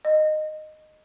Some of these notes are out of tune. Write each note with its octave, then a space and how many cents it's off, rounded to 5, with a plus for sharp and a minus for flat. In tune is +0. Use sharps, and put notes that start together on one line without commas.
D#5 -15